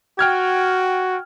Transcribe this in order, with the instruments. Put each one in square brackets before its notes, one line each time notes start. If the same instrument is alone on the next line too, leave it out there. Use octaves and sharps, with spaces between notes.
[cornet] F#4 [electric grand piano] G5 F6 G#6